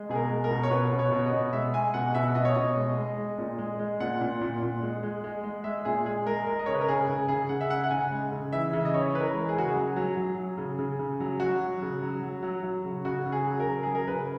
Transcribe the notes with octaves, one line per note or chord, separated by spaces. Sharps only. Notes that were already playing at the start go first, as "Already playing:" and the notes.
Already playing: G#3
B2 G#4
A#4
G#3
A#4
B2
C#5
B2 B4
B2
C#5
B2
D#5
B2
G#3 E5
G#3 G#5
B2 F#5
B2 E5
B2 D#5
C#5
B2 D#5
G#3
G#3
G#3
A#2
G#3
G#3
A#2 F#5
A#2
A#2
A#2
G#3
G#3
G#3
G#3
G#3 E5
A#2 G#4
G#3 G#4
G#3 A#4
G#3 A#4
D#5
C#3 C#5
B4
A#4
C#3 G#4
C#3
C#3 G#4
C#3 F#5
E5
C#3 F#5
F#5
C#3 G#5
G#3
C#3
E3 E5
C#3
D#5
E3 C#5
E3 B4
A#4
G#3
G#4
C#3 F#4
G#4
F#3
F#3
F#3
F#3
C#3
C#3
C#3
F#3
F#3 F#4
F#3
C#3
F#3
F#3
F#3
F#3
C#3
C#3 F#4
C#3
G#4
F#3
A#4
C#3
F#3 G#4
A#4
C#3 B4